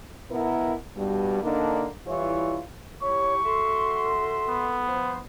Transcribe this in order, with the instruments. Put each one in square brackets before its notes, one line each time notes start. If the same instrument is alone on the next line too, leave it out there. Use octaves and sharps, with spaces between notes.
[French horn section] B2 B3 E4 A#4
G2 B2 G3
D3 A#3 D4 D#4
E3 G3 E4 F4 C#5
[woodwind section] E4 G4 [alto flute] C#5 [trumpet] C#6
[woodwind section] F#4 E5 C6 [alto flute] A4
[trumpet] B3
[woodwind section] F3 C5